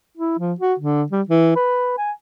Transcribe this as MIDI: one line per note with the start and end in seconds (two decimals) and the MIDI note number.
0.17 0.36 64
0.39 0.53 53
0.60 0.74 66
0.79 1.04 50
1.12 1.22 55
1.29 1.55 52
1.56 1.94 71
1.98 2.11 80